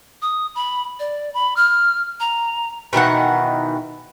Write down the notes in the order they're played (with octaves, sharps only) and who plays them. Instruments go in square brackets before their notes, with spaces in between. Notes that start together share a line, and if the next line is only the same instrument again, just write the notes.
[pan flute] D#6
B5
D5
B5
F6
A#5
[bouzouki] B2 D#3 E3 F#5